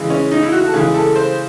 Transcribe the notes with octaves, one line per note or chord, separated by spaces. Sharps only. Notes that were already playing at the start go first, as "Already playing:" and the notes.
Already playing: C#3 E3 G#3
C#4
D#4
E4
F#4
A4
C#3 E3 G#3 G#4
A4
C5